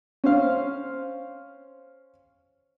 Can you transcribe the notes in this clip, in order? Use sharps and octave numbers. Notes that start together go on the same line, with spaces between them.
C#4 C5 F5